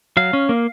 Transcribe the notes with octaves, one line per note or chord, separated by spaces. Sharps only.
F#3 F5
C#4
A#3